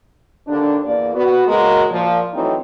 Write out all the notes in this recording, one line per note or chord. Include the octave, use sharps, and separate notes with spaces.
D#2 D3 D4
E2 A#3 D5
B3 F#4
C#3 G#3 A#3 F#4 A#4
A#2 F3
E3 F#3 A3 C4 D#4